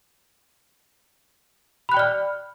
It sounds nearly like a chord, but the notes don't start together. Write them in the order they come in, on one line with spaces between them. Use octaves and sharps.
B5 F#6 G5 D5 F6